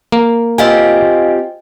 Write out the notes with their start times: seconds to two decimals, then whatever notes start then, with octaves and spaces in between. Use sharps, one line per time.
0.12 A#3
0.58 C4 F4 G4 D#5 F5 G#5